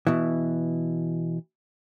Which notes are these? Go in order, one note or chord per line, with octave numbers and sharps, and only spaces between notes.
B2 E3